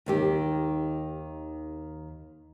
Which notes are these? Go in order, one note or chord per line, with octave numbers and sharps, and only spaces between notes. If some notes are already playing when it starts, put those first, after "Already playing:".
D#2 D#3 G4